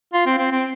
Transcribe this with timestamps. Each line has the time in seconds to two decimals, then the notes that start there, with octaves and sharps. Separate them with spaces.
0.14 F4
0.26 C4
0.38 C4
0.51 C4